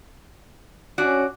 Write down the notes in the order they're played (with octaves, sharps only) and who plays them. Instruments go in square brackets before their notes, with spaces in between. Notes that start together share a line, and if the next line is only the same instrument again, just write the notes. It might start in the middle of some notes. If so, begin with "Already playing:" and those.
[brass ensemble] C#4 [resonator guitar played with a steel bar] D4 F#4 D5